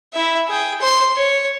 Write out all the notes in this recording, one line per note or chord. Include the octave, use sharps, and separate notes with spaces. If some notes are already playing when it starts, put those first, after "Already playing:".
E4 E5
G#4 G5
C5 C6
C#5